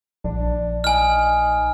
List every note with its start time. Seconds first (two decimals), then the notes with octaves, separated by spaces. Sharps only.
0.25 A#1 D4
0.84 D#4 G#5 F6